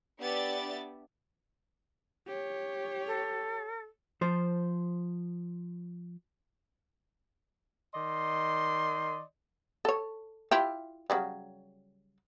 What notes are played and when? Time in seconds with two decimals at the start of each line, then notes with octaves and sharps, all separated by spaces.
0.19 B3 D4 G4 D5 E5 A6
2.27 G4 C#5
3.06 A4
4.21 F3 C5
7.94 D#3 D5 D#5 C6
9.85 A4 C#5
10.51 E4 F4 G4
11.10 C#3 F#3 G3